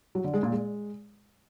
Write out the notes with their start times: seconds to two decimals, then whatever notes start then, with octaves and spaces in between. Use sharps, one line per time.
0.15 F#3
0.24 D3
0.34 G#3
0.43 A#2
0.52 G#3